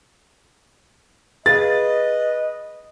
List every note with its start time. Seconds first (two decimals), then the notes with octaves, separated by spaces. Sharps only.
1.46 G#4 B4 D#5 F5 A6